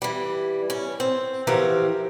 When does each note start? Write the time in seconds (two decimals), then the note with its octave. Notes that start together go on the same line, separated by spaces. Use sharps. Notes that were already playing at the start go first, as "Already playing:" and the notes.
0.02 E3 G3
0.70 C#4
1.00 C4
1.47 E3 F3 F#4 G4 A#4